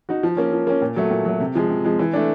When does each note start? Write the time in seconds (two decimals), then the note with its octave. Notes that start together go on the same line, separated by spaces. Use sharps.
0.09 D#4 F#4
0.23 F3
0.37 A#3 C#4
0.52 F3
0.67 A#3 C#4
0.82 A#2
0.96 F#3 A3
1.11 A#2
1.25 F#3 A3
1.40 C3
1.55 F3 G#3
1.69 C3
1.85 F3 G#3
1.99 E3
2.13 A3 D4